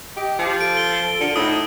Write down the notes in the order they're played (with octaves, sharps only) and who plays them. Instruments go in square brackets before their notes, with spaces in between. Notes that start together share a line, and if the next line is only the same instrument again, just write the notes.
[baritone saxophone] G4 [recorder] D#5
[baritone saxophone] F3 [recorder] G4
[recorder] A4 [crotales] D7
[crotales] G7
[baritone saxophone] D3 [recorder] F4
[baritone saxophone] A2 [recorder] D#4 [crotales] D#6